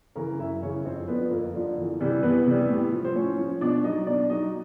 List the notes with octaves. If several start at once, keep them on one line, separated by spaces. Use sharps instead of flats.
C#3 E3 A#4 A#5
F#2 E4 E5
C#3 E3 C#4 C#5
F2 C4 C5
D3 F3 B3 B4
F2 A#3 A#4
D3 F3
E2
C3 E3 G3
E2 B3 B4
C3 E3 G3
A2
F3
C5
A2 C#4 C#5
F3
B2 D4 D5
F#3 D#4 D#5
B2 D4 D5
F#3 D#4 D#5